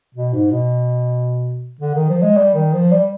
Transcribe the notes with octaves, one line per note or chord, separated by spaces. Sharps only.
B2
G#2
B2
D3
D#3
F3
G#3
G3
D#3
F3
G3